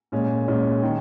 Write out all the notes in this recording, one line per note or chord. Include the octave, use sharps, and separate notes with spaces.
A#2 G#3 C#4
A#2 G#3 C#4
D#3 G#3